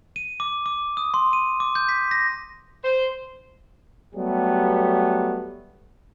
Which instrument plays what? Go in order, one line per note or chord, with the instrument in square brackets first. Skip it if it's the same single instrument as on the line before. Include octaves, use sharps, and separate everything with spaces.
[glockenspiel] D#7
D6
D6
D#6
C6
D#7
D6
G6
B6
A#6
[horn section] C5
[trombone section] F#3 G3 A3 B3 G4